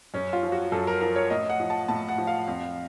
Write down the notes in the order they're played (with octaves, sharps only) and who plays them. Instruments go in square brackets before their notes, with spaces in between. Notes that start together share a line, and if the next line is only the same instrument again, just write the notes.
[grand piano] F#2 C#4
F4
F3
F#4
F#2 A4
A#4
F3 A#4
C#5
A2 D#5
F#5
F3
A5
A2 A5
F#5
F3
F5
F2